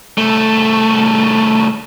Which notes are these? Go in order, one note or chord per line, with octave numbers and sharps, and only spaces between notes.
C2 A3